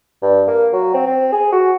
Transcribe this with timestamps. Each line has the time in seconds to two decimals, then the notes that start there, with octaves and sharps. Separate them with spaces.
0.22 G2
0.48 A#3
0.73 F#3
0.94 C4
1.07 C4
1.32 G#4
1.52 F#4